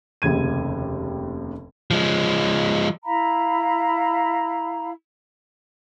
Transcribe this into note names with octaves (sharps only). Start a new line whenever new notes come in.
F1 D#2 C#3 G#6 D#7
F3 G#3
E4 F5 A#5 B5